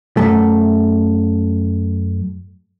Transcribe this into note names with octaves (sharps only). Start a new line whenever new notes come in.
F#2 A3